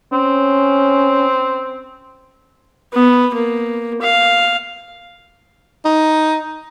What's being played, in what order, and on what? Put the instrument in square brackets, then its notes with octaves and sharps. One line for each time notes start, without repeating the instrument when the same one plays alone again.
[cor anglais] C4 [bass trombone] C#4
[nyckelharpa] B3
A#3
F5
[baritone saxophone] D#4